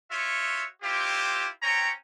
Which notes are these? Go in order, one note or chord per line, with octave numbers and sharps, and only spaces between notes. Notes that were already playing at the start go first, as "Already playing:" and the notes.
F4 F#4 C#5 E5
C4 E4 F4 G4
C4 C#4 C#5 G5 A#5